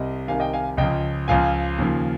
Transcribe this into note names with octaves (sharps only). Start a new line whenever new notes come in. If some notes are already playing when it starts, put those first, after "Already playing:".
Already playing: C2 C3 D#5
C2 C3 D#3 F5 G#5
D#5 G5
F5 G#5
C#2 C#3 F3 D#5 G5
C#2 C#3 F3 F5 G#5
D#2 C#3 F3